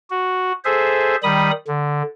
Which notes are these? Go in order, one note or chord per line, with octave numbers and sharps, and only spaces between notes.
F#4
G#4 A4 C5 E5
D#3 G3 B5 D#6
D3